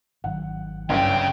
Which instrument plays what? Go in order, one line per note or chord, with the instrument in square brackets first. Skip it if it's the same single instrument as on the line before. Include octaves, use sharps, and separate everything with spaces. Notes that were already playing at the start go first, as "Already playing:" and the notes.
[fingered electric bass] G#1 D#3 F#3 [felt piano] F#5
[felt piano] G1 C2 F#2 [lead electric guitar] C#3 C#4 [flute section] G5